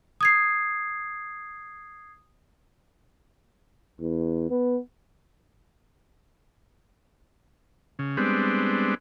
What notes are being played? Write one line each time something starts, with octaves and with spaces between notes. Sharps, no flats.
D#6 G#6 C7
E2
B3
C#3
G3 G#3 B3 C4 D4